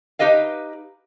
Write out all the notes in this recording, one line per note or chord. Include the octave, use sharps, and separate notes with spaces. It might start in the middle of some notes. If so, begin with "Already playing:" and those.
D#4 G4 B4 D#5 F5